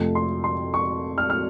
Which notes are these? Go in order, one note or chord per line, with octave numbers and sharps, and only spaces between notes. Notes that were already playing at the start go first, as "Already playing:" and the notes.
Already playing: F2 C3 F3 A3
C6
C6
C#6
F6
F6